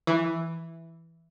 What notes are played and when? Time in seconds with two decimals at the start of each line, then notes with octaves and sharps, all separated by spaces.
0.07 E3